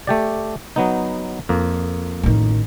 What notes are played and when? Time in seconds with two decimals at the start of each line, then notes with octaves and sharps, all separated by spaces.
0.07 A3 G4 D5
0.76 F#3 B3 D#4
1.49 F2 A#3
2.23 A1 D#3